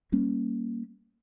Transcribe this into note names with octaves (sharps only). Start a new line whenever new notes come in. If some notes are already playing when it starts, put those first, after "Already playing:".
G3 A#3 C#4